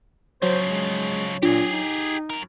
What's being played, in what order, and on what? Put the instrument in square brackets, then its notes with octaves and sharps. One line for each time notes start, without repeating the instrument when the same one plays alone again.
[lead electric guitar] C#3 F3 [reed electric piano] F#3 C#5 [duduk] C5
[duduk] G#3
[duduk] A#2 [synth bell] D4 F4 [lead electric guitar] G4 G#4
[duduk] D#4 [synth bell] C7
[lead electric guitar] F#2 A#4